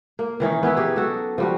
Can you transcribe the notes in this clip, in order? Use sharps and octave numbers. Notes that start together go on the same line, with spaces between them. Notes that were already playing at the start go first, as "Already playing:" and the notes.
A#3
D#3 E3 C#4 D#4
B3 C#4 E4 B4
D#4 G4 G#4
F#3 F#4 A4
F3 G3 F#4